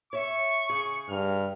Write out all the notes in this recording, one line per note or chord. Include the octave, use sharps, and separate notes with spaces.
C#5 E5 C#6
C#3 G#4
G2 F6